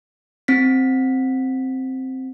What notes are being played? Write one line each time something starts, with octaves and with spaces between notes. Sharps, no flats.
C4 B6